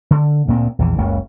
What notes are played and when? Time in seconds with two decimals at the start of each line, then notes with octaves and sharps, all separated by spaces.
0.11 D3
0.48 D2 A#2 G#3 C4
0.79 A#1 E2 E3
0.98 F#1 C#2 F#2